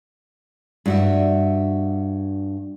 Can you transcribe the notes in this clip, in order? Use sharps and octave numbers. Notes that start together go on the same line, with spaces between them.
G2 F#4 E5